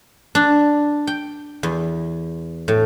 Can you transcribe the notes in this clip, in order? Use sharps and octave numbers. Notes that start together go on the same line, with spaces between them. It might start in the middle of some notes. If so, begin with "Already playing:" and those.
D4
G5
E2
A2